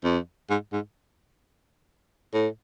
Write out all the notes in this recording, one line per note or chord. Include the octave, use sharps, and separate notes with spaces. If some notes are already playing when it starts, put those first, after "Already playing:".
F2
G#2
G#2
A2